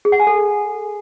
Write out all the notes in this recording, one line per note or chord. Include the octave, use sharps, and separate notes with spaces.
G#4
F#5
G#5
A4